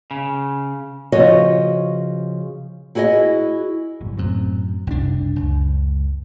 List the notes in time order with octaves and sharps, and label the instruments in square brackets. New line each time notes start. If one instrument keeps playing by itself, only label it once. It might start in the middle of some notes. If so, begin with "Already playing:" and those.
[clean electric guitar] C#3
[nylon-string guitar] C#3 F3 F#4 C#5 D#5
E4 F#4 G#4 C#5 D#5
[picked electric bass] G1 F#2 A#2
[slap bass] F#2 [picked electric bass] A2 C4
[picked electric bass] F#1 [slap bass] C2 C#4 D4
[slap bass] C#2